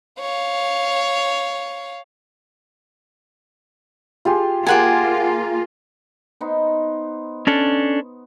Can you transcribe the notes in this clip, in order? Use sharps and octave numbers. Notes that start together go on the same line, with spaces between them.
C#5 F5
F4 G4 G#4
A#3 F4 G4 G#4 A#4 F#5 G#5
B3 D#4 C5
C#4 D4 A4